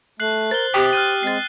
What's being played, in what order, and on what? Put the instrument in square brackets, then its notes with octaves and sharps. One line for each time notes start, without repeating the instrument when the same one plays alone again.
[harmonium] A3 [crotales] F#6 C7 F#7
[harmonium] A#4 [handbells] C5 [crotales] A6 G7
[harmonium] C3 [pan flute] G4 [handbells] G5 D#6
[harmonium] C5 [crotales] F6 F#6 D#7
[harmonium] G#3 C4 [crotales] A6 C7